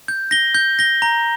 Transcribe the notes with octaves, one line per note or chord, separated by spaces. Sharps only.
G6
A#6 G7
G6
A#6 G7
A#5